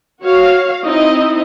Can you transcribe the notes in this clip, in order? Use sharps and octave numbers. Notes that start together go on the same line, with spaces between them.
F#4 C#5 F5
C4 D#4 E4 D#5